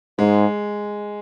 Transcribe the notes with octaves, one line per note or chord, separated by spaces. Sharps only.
G#2 G#3